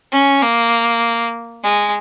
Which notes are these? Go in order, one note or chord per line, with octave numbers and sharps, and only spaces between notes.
C#4
A#3
G#3